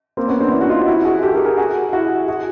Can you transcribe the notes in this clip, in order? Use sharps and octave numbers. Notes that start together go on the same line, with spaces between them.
A#3 C4
B3 C#4
C4 D4
D4 E4
F#4
D#4 F4
E4 F#4
F#4 G#4
G4 A4
G#4 A#4
G#4 A#4
F#4 G#4
E4 F#4
F#4 G#4